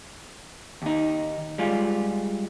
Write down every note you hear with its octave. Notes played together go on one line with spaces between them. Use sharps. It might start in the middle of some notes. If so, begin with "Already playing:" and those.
D#2 D#4
G3 G#3 F4